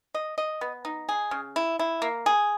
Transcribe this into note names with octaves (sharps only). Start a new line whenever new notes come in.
D#5
D#5
B3
D#4
G#4
C#3
E4
E4
A#3
G#4